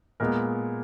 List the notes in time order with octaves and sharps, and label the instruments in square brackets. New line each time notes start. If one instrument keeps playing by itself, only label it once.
[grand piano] A#2 G#3 B3 A#4